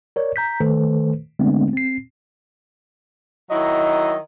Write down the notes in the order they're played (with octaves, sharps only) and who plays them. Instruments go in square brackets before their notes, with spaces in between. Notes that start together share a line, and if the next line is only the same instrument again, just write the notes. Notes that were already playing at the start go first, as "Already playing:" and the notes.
[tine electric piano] A#4 C#5 D5
A#5 G6 B6
D#3 A3 A4 B4 C5
D3 G#3 A3 B3 C4 D4
C4 C7
[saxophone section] D#3 F#3 E4 [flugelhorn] D#5